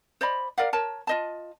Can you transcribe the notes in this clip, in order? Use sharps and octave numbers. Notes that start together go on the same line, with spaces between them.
C5 D5 D#5 B5
A#4 D5 F5 F#5
A#4 C#5 A5
F4 D#5 A5